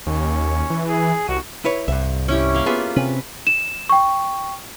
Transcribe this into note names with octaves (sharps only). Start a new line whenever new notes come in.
D#2 C#4
E3
G#4
C2 F#4
E4 B4 C#5
C2 G2 E5
C#4 E4 G4
A#3 F5
B3 F4 G#4 E5
C3 C4 C#4 B4
E7
G5 C#6